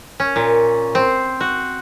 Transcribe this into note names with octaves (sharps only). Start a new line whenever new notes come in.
C#4
A#2
C4
F#4